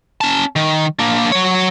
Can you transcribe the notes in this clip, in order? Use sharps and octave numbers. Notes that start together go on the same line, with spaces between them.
C#4 A5
D#3
A#3 D4
F#3 C#5